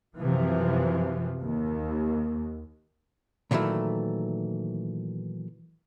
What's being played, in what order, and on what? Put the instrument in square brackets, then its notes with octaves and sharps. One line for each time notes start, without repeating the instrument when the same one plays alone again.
[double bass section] F#2 C3 E3 F3
D#2
[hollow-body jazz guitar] A#2 D#3 E3 F#3 A3